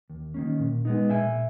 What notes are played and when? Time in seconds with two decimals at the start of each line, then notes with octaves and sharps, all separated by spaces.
0.10 D#2
0.34 D#3 A#3 C#4
0.59 A#2
0.85 G#3 B3 D#4
1.09 A#2 E5 G#5